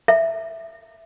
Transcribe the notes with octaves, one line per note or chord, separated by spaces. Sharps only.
E5